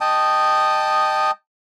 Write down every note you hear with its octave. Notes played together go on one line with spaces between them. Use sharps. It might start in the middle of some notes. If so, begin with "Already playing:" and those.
D#5 G5 A5 D#6